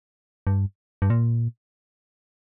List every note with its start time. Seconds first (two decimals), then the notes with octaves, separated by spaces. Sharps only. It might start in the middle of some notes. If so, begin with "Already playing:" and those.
0.47 G2
1.02 G2
1.10 A#2